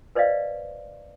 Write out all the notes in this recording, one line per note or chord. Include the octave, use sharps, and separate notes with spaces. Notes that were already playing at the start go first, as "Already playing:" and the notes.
B4 C5 D5 D#5 F5